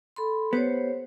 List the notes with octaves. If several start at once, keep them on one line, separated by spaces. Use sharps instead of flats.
A4 B5 C6
B3 G4 C5 C#5